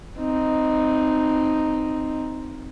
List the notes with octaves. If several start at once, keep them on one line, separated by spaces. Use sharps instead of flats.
C4 D#4